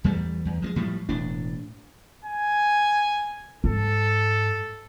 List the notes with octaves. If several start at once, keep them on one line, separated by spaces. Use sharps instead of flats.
E2 G3 A3
E2
F3 G3 G#3
A2 F3 G3
E1 A2 D4
G#5
G#2 A4